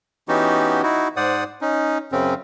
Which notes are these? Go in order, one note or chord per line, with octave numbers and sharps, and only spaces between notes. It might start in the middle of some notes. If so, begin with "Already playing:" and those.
E3 B3 C#4 D#4 F#4 G4
D#4 E4 F#4
G#2 C5 D5 F#5 D#6
C#4 D#4
F#2 C#3 C4 C#4